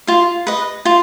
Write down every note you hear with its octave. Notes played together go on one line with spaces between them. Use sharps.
F4 F5
B4 D#5
F4